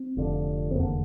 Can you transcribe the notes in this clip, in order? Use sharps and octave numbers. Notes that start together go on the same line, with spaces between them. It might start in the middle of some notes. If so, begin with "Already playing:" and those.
Already playing: C4
F1 F2 D3
C4
F1 E2 D3 A#3